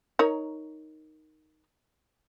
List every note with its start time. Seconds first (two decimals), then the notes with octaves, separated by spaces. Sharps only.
0.19 D#4 A#4 C#5